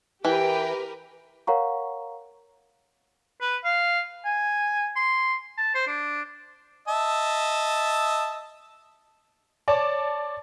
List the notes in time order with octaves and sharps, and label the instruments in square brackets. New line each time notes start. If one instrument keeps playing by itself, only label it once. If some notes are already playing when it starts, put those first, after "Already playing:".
[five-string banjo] E3 [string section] G4 A#4 B4 [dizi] G5
[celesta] A#4 C#5 F5 F#5 A#5 C#6
[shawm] B4
F5
G#5
C6
A5
C5
D4
[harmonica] D#5 E5 A5
[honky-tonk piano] C#5 D5 A5 D6